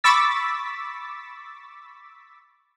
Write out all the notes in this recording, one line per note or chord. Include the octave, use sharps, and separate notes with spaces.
B5 C#6 D6 E6 A6 B6